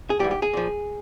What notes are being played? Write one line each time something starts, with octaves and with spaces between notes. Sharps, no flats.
G#4
G#2 E3 G3 G4
G4
G#4
A#2 F3